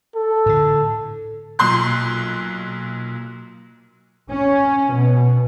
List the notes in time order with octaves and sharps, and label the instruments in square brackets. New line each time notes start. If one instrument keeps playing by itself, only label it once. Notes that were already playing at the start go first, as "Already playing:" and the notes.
[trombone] A4
[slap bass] A2 D3
[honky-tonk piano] B1 A#2 C6 F#6
[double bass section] C#4
B2